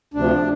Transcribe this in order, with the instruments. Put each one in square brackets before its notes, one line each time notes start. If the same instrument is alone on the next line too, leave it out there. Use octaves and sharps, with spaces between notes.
[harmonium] D2 C3 F3 D4